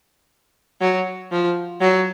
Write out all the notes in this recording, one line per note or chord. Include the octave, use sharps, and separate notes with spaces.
F#3
F3
F#3